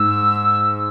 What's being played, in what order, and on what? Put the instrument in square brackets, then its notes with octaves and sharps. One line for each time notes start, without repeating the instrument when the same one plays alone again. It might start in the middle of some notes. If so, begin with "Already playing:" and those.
Already playing: [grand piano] G#2 [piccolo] E6